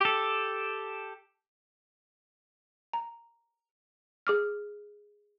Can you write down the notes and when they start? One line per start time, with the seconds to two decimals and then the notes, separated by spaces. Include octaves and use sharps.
0.01 G4 A4
2.93 A#5
4.27 G#4 D6 F6